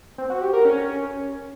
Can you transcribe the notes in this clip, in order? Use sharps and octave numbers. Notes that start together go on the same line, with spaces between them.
C4
F#4
G4
A#4
C#4